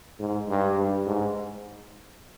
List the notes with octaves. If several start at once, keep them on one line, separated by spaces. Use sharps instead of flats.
G#2
G2
G2
G#2